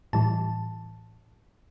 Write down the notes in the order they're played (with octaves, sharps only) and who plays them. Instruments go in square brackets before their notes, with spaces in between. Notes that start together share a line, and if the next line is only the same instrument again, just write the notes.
[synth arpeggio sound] A2 E3 G3 A5